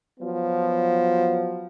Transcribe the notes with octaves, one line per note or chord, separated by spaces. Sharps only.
F3 F#3 B3